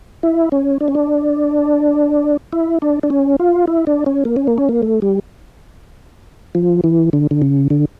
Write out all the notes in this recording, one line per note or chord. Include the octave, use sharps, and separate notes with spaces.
E4
C#4
D4
C#4
D4
E4
D4
D4
C#4
F4
E4
D4
C#4
A#3
C#4
A#3
C#4
A#3
A3
G3
F3
E3
D3
D3
C#3
D3